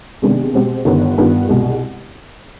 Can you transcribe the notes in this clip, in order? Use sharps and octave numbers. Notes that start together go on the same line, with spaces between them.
C3 D#3 G#3 B3 D4
B2 G#3 C4 G4
G1 G2 D#3 B3
G2 D#3 B3 F4
C2 B2 G#3